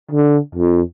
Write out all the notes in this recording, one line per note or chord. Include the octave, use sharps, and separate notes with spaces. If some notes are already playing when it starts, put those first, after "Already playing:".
D3
F2